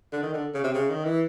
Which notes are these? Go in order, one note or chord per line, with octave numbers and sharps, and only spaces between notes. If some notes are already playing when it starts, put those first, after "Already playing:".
D3
D#3
D3
C#3
C3
C#3
D#3
E3